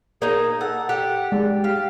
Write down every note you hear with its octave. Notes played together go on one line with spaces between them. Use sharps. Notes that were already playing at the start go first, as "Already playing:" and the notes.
A#3 D#4 G#4
A4 F#5
G4 F#5
G#3 D5
G4 F5